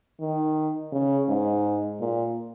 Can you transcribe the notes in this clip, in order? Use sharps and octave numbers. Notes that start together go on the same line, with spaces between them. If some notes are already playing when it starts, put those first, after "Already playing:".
D#3
C#3
G#2
A#2